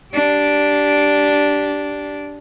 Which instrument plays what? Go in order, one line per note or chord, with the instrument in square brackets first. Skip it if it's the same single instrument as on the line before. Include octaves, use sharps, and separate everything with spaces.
[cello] D4 G4